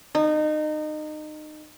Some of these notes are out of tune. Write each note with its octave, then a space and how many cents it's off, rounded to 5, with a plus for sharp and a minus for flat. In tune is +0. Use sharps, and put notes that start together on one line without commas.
D#4 -25